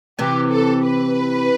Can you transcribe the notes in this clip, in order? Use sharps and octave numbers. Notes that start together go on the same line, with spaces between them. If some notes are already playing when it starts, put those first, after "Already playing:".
C3 E3 G4
A4
B4